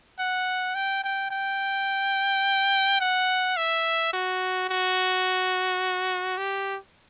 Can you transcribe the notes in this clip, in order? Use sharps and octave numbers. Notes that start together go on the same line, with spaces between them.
F#5
G5
G5
G5
F#5
E5
F#4
F#4
G4